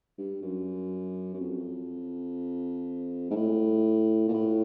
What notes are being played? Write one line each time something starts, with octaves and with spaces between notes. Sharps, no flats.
G2
F#2
F#2
F2
G#2
A2
A#2
A2